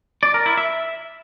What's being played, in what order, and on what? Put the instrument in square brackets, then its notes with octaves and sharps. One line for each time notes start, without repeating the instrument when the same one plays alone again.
[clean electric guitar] D5
A#4
E4
E5